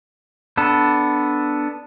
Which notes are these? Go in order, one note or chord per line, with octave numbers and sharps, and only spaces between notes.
B3 D4 A4